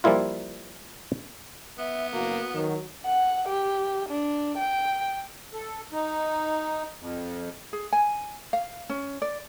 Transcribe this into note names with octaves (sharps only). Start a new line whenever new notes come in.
F3 G3 A#3 E4 F4
B3 E5
F#1 A#3 F#4
D#3 F#3
F#5
G4
D4
G5
A4
D#4
F2
G#4
G#5
F5
C#4
D5